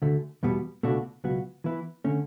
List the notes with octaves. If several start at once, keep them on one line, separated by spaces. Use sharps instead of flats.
D2 D3 A3
E2 B2 G3 B3
C#2 B2 A3 D4 F#4
C#2 B2 F#3 B3 F#4
E3 B3 E4 B4
D3 A3 C#4